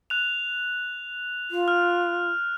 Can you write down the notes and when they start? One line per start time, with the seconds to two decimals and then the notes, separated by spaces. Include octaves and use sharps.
0.10 F#6 F7
1.51 F4
1.68 F6